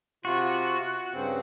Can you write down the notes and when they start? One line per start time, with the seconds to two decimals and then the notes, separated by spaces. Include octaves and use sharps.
0.25 C3 F4 F#4
1.13 G2 C#3 C4